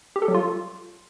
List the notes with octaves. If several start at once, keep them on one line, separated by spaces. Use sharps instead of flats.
G4
A4
F#3
F4